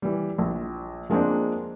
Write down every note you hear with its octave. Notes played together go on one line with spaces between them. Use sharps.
E3 G3
A#1
F3 G#3 A#3 C4 D4